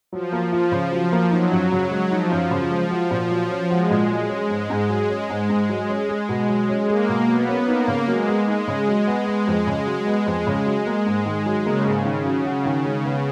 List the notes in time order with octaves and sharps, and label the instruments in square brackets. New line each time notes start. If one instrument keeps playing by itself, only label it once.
[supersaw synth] F3 [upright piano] F#3
[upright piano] A#3
[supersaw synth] F3 [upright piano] F4
[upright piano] C#3
F#3
A#3
[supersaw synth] F#3 [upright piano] D#4
[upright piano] F#2
C#3
G#3
[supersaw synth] F3 [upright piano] D#4
[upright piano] F#2
C#3
G#3
F#4
A#2
F#3
C#4
[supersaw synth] G#3 [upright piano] F#4
[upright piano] A#2
F#3
C#4
G#2
G#2
F#3
C#4
G#2
G#2
F#3
C#4
G#4
B2
F#3
C#4
[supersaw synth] A#3 [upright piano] G#4
[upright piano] B2
[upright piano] F#3 [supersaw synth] B3
[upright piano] C#4
[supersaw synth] A#3 [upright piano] D#4
[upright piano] C#3
[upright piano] F#3 [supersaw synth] G#3
[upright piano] B3
[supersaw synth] G#3 [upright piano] D#4
[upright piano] C#3
F#3
B3
B3
F2
C#3
F#3
B3
F2
C#3
F#3
A#3
G#2
D#3
F#3
[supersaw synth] C#3 [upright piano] A#3
[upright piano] G#2
D#3
F#3
F#4
D#3
G#3
B3